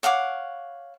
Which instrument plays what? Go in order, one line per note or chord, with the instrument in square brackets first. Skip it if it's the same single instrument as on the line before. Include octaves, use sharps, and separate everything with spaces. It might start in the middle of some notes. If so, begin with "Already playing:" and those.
[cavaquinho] C#5 F5 F#5 D6